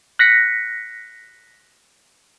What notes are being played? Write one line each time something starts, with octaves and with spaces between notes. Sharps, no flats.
F#6 A#6 B6 C#7